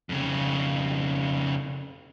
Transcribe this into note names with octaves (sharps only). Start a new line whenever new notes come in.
F2 C#3